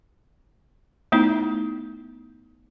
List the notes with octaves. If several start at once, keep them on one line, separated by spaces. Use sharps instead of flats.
A3 B3 D#4 E4